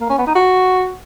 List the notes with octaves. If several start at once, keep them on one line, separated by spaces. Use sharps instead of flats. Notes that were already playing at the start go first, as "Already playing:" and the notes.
A#3
C#4
B3
D#4
F#4